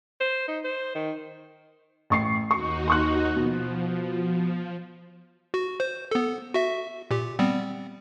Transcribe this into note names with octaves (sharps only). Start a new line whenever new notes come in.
C5
D#4
C5
D#3
A1 C#6 C7
D#2 D#4 F#4 C#6
C6 C#6 F#6
B2 F3
F#4
C5
B3 A4
F#4 E5
A#2 G4
G3 B3 C4